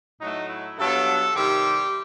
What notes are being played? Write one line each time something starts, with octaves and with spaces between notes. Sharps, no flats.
A2 F#3 A3 D#4
E4
G2 F#3 B3 A4
C3 D#3 G3 C4 G4